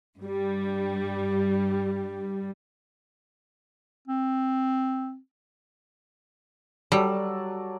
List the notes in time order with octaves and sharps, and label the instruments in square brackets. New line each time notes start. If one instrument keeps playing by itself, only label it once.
[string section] G2 G3
[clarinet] C4
[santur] F#3 A4 D5 [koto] G3